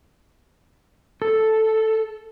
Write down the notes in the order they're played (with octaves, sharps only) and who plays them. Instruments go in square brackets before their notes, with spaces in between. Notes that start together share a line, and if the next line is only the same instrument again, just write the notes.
[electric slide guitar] A4